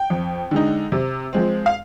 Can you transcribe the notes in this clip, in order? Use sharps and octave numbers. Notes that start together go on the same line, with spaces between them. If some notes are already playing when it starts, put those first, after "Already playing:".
Already playing: G5
F2
D3 G#3 D#4
C3
F3 G#3 C4
F5